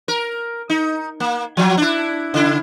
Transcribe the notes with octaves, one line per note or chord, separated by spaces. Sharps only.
A#4
D#4
A#3
F3 F#3
D4 E4
C#3 E4